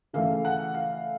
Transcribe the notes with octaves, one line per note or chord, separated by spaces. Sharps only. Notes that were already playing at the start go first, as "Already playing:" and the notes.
C#3 E3 A3 F5
F#5
F5